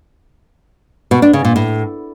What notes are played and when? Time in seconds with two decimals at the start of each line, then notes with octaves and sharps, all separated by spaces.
1.11 B2
1.22 D4
1.33 C#3
1.45 A#2
1.56 A2